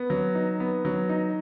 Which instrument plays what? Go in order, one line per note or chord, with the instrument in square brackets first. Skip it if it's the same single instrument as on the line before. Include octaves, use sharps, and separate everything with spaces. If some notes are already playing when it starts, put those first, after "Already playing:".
Already playing: [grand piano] B3
F#3
D#4
B3
F#3
D#4